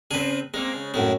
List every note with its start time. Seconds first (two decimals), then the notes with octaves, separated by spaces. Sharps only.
0.11 C#3 C4 G#4 B4
0.54 G#3 A#3 C4 A#4
0.75 C#3
0.94 F#2 A2 G#3